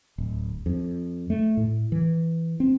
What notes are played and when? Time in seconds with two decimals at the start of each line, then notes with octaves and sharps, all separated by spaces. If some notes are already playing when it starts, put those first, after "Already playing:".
0.18 D1
0.66 F2
1.30 A3
1.57 A2
1.92 E3
2.60 C4